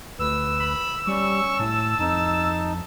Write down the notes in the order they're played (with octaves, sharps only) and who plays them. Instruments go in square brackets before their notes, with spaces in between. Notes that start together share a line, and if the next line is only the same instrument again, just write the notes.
[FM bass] D2 [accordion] B4 [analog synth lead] E6
[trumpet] B5
[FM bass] G3 [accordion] C#4 [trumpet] C#6
[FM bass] A2 [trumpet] A5
[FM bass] F2 [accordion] D#4